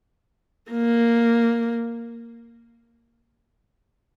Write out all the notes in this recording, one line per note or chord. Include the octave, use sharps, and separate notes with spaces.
A#3